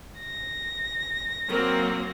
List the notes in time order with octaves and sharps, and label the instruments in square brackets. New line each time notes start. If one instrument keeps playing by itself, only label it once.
[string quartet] A#6
[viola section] F#3 A#3 C4 [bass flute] A#4